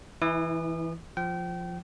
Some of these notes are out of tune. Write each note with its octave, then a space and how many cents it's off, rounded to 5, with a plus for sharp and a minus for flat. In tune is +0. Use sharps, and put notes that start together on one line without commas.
E3 +0 E4 -35 D#6 -40
F3 +0 G5 -30